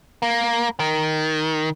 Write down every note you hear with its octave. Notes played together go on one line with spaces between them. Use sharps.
A#3
D#3